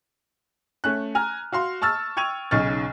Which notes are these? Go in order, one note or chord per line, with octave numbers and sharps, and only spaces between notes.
A3 C#4 F#6
G#5 A#5 F6
F#4 F5 C6
A5 C#6 E6 F6 A6
G5 C#6 G#6 D#7 F7
B1 C#3 D#4 C#6 F6 A6